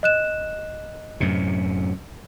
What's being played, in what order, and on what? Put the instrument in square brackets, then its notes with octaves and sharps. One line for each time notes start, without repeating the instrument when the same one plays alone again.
[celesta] D#5 F#6 E7
[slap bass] F#2 A2 C3